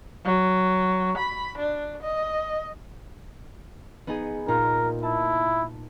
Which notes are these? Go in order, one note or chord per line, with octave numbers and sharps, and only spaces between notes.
F#3
B5
D4
D#5
B3 D#4 G#4
A#2 D#4 F4 A#4
E4 A5